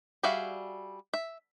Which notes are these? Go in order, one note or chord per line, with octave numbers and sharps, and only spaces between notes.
G3 F#4 G#4 E5 F5
E5